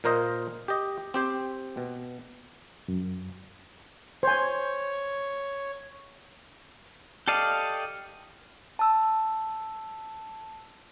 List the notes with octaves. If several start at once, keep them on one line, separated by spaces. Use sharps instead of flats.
A#2 A#3 A#4 C5 D#5
G4 D#5
C4 G4 C5
B2
F#2
C5 C#5 G#5
G4 A4 D5 D#5 F5
A5 E6